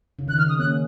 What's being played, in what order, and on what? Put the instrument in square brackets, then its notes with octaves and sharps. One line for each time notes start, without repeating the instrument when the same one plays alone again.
[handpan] C#3
[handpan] D#3 [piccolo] F#6
[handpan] C#3 [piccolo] F6
[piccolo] D#6
[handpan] A#3 C#4 [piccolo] F#6